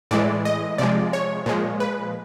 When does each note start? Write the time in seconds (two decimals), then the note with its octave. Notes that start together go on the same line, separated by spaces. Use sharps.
0.11 A2 E3 G#3 D5
0.45 D#5
0.78 C3 F3 G#3 D5
1.13 C#5
1.46 A#2 F3 G#3
1.80 B4